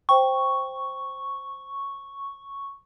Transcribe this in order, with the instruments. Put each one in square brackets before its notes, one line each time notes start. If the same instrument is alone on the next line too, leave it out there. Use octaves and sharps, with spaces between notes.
[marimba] C5 G5 [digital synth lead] C#6